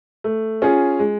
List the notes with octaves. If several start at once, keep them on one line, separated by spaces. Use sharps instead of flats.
A3
C#4 F4 G#4
G#3